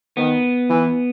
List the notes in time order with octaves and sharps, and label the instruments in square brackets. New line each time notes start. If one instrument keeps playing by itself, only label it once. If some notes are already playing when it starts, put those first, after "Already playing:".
[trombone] D#3 [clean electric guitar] B3
[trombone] E3